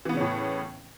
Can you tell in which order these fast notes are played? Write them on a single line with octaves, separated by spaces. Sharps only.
E3 B3 C#3 C#4 A2